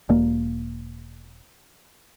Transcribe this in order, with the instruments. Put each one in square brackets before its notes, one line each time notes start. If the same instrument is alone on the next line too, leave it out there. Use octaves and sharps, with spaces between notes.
[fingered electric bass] E1 A#3